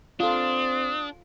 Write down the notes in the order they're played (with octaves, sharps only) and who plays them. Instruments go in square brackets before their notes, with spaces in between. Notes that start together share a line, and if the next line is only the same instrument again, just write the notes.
[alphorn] C4 [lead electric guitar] D4 [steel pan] F4 A4 [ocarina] D#6